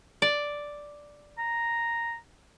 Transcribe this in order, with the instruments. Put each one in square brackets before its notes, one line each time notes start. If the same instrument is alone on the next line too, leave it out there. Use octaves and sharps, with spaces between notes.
[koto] D5
[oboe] A#5